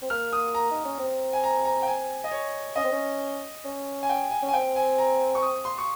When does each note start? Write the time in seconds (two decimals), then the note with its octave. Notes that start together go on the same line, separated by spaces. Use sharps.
0.02 C4
0.10 A#3 F6
0.33 D#6
0.54 A#5
0.71 D#4
0.85 C#4
0.99 C4
1.33 G#5
1.44 A#5
1.65 A#5
1.82 G5
1.87 G#5
2.24 D#5
2.32 C#5
2.76 C#4 D#5
2.84 C4
2.92 C#4
3.65 C#4
4.03 G#5
4.09 G5
4.31 G#5
4.42 C#4
4.49 G#5
4.53 C4 G5
4.76 G#5
4.98 A#5
5.35 C#6
5.42 D#6
5.65 C6
5.78 C#6